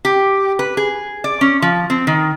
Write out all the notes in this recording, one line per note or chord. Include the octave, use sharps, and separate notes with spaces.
G4
B4
G#4
D5
C#4
F3
C4
D#3